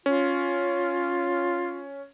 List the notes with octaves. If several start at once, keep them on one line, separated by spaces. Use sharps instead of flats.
C#4 F4